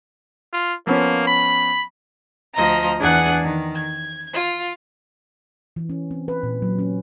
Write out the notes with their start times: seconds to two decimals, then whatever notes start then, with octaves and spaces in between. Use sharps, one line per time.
0.53 F4
0.87 F3 A#3 B3 C#4
1.27 B5
2.54 D2 F3 D#5 A#5
2.98 E2 D4 G#4 F#5 G#5 F#6
3.41 D#3
3.75 G#6
4.33 F4
5.76 E3
5.89 C#4
6.11 C4
6.28 B4
6.43 A#2
6.62 F#3
6.79 C#4